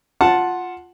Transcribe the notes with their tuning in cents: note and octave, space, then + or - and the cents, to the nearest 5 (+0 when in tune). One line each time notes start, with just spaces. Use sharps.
F4 +5 F#5 -5 A5 +0